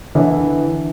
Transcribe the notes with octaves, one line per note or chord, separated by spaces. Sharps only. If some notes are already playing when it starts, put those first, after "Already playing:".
D3 E3